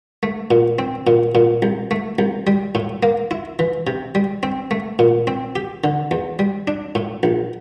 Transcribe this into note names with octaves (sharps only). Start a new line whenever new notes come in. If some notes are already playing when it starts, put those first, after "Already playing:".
A3
A#2
C4
A#2
A#2
C2
A3
C2
G3
A2
A#3
E4
E3
C3
G3
C4
A3
A#2
C4
G4
D3
E2
G3
D4
A2
A#1